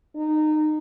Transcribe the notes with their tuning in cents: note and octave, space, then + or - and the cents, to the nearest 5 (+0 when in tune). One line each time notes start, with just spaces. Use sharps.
D#4 -20